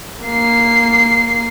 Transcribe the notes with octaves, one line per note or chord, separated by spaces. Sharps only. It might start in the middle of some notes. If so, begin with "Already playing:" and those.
A#3 C7